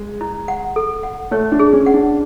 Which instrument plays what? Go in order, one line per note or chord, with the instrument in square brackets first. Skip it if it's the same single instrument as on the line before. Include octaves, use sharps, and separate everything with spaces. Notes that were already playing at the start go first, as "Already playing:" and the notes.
Already playing: [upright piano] G#3
[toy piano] E4
F#5
A4
F#5
[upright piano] A3 [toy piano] C#5
[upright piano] D4
[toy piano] G#4
[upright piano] C#4
[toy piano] F#5
[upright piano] D4